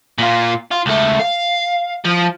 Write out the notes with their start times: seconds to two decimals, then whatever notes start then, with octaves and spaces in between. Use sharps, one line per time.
0.18 A#2 F4
0.71 F4
0.86 C#2 A3
1.19 F5
2.05 F3